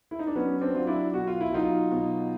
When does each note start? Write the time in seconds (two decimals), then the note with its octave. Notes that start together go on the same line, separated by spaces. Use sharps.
0.11 E4
0.19 D#4
0.27 D4
0.35 F#3 B3 C#4
0.61 C4 D4
0.75 F#3 F4
0.87 D4 E4
1.14 B2 F#4
1.27 F4
1.41 E4
1.52 F#3 D#4 F4
1.91 B2